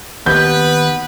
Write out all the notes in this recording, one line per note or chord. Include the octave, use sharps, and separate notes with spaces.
D#2 B3 B4 G6